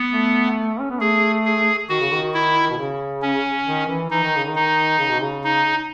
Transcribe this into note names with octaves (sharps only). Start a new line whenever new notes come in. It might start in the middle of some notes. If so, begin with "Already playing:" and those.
Already playing: B3
A3
C#4
B3
A3 G#4
G#4
D#3 F#4
C#3
D#3
E4
B2
C#3
C#4
D#3
E3
E3 D#4
D#3
C#3
D#3
D#4
C#3
B2
C#3
D#4